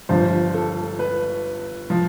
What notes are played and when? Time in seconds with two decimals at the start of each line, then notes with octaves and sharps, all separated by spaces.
0.09 G1 G2 F3 C5
0.54 A4
0.99 B4
1.90 F3